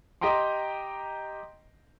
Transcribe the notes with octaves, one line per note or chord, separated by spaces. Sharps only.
G4 D#5 G5 A#5 C6